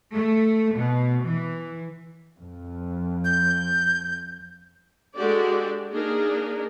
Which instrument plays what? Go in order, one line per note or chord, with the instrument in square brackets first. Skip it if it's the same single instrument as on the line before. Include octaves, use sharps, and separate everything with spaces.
[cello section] A3
B2
E3
[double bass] F2 F3
[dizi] G6
[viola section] G#3 D4 F#4 G4 A4 D5
A#3 D4 D#4 G#4 A#4